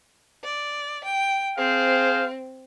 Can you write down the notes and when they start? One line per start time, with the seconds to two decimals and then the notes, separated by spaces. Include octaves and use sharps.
0.44 D5
1.04 G5
1.58 C4 G#4 C5 F5